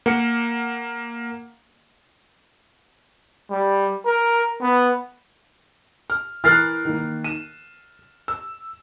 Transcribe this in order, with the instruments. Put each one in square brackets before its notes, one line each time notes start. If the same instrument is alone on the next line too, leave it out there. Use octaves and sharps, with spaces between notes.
[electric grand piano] A#3 F#5 C#7
[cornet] G3
A#4
B3
[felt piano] F6
[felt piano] E3 A#4 F#6 [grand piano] F6 A6 C7
[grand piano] D#3 A#3
[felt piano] D#7 [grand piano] E7
[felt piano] E6